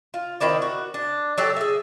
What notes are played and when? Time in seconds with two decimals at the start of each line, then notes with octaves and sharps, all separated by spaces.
0.14 F4
0.40 D#3 C4 E4 D5
0.62 F#4
0.94 D4
1.38 F#3 G4 A4
1.56 G#4 E5